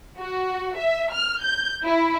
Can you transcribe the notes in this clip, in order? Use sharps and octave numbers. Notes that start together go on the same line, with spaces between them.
F#4
E5
F6
G6
E4